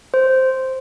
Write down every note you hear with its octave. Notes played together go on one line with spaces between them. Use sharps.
C5